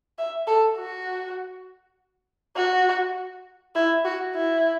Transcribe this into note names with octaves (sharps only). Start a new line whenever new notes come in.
E5
A4
F#4
F#4
E4
F#4
E4